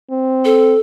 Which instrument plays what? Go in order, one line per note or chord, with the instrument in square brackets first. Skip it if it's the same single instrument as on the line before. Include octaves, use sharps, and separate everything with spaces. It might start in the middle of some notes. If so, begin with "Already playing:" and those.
[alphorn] C4
[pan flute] A4